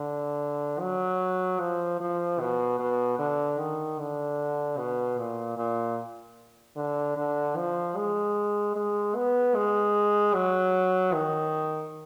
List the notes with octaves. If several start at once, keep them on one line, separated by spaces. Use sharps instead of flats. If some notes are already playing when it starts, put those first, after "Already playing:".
Already playing: D3
F#3
F3
F3
B2
B2
D3
D#3
D3
B2
A#2
A#2
D3
D3
F3
G#3
G#3
B3
G#3
F#3
D#3